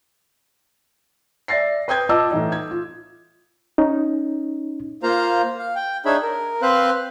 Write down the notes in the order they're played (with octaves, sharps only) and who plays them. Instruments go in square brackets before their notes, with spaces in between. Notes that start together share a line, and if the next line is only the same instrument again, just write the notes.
[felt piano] D5 E5 A6 A#6 C7
B4 G5 D#6 G6 G#6
F4 D#5 A5 D6 E6
A2 E3 D#4
G#6
F4
[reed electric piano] C#4 D#4
[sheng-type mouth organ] A#3 F4 C5 F5 A#5
F5
G5
D4 D#4 G#4 C#5 E5 B5
A#4
C4 B4 C5 F5 F#6